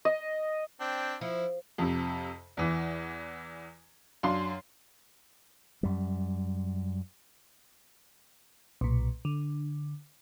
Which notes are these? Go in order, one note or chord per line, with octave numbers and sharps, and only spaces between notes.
D#5
C4 D4 G5
F3 E4
F2 C3
E2 E3
F#2 D4 F5 C6 C7
F#2 G3
B1 A#2
D3